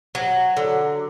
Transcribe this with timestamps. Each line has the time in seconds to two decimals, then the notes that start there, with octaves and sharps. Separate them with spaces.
0.15 F#3
0.57 D3